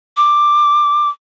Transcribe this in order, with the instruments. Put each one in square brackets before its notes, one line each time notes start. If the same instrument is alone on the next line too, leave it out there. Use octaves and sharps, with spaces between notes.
[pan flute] D6